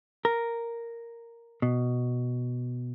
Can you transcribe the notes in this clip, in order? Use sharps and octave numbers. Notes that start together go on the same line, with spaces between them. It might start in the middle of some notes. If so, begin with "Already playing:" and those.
A#4
B2